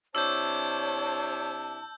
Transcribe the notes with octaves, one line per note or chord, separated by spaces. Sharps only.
C3 D4 E4 C#5 A5 E6 G6